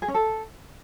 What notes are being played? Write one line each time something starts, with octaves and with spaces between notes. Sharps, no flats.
G#4
C#4
A4